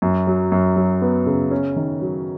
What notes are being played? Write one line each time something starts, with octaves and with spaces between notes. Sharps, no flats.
F#2
F#3
F#2
F#3
B3
C#3
C#4
D#3
F#3